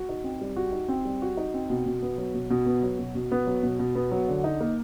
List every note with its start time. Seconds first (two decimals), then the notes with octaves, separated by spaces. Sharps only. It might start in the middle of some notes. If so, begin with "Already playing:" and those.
Already playing: F#4
0.09 D#4
0.24 C4
0.41 G3
0.56 F#4
0.72 D#4
0.89 C4
1.05 G3
1.22 F#4
1.37 D#4
1.54 C4
1.70 B2
1.86 B2
2.02 B3
2.18 F#3
2.34 B2
2.50 B2
2.66 B3
2.83 F#3
2.99 B2
3.15 B2
3.32 B3
3.47 F#3
3.63 B2
3.79 B2
3.95 B3
4.12 F#3
4.28 D3
4.44 D#4
4.60 A#3